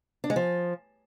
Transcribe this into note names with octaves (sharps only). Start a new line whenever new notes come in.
D4
G#3
F3